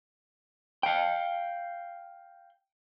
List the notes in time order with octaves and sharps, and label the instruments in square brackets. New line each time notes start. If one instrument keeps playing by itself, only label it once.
[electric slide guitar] F5 G5